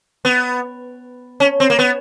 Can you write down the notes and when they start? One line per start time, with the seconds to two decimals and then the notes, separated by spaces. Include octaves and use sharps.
0.25 B3
1.40 C#4
1.60 C4
1.70 A#3
1.79 B3